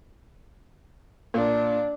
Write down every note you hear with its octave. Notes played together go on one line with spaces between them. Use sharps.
A#2 D4